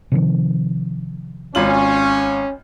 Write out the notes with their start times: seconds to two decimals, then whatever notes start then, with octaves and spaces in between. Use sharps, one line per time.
0.12 C3 D#3 F3
1.55 G#1 C#4 F4 F#7